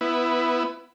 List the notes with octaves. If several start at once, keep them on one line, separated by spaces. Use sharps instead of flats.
B3 E4